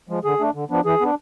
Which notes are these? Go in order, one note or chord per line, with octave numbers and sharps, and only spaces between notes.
F3 G#3
D3 G#4
A3 D4
D3
F3 B3 D4
E3 G#4
B3 D4